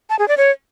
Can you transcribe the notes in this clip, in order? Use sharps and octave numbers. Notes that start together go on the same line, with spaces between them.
A5
G#4
D5
C#5